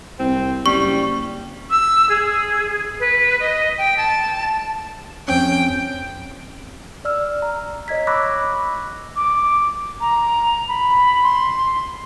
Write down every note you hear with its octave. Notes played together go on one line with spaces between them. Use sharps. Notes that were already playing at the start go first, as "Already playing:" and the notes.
C2 C4
F#1 G3 C#6
E6
G#4
B4
D#5
G5
A5
F2 C4 C#4 G5
D5 E6 F6
A#5
C#5 D#5 G#6 B6
B5 C#6 D6 E6 F#6 A#6
D6
A#5
B5
C6